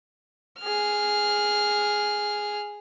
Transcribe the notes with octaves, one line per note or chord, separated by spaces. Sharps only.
G#4 F6